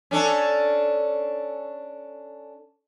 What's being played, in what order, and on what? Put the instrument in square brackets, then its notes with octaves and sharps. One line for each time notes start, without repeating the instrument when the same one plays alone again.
[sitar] C#4 D4 A4